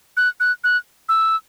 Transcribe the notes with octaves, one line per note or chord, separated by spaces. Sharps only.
F#6
F#6
F#6
E6